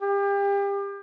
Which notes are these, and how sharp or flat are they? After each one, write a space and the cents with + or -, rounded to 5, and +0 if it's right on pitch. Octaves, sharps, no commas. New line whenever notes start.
G4 +35